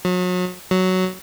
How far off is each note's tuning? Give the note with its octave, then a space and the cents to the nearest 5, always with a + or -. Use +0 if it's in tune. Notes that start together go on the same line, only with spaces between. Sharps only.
F#3 -35
F#3 +5